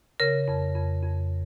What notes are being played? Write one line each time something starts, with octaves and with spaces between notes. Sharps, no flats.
C#3 A#4
F2
F2
F2